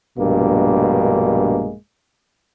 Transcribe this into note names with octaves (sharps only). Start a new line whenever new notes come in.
A#1 G2 B2 G#3 A#3